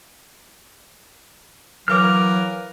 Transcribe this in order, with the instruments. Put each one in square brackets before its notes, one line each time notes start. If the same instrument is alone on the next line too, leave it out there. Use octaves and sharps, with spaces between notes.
[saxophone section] E3 A#4 F5 [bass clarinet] F#3 [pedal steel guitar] D6 F6